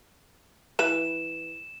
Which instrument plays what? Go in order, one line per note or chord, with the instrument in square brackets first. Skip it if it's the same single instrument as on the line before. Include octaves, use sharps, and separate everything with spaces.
[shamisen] E3 B4 [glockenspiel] E7